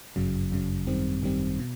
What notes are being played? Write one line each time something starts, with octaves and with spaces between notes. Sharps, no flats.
G1 F#2 C#3 F#3
G1 F#2 C#3 F#3
G#1 F#2 D#3 G3 C4
G#1 F#2 D#3 G3 C4
B2